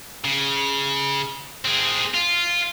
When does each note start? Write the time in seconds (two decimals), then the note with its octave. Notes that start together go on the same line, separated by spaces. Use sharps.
0.25 C#3
1.65 C4 G#4
2.14 F4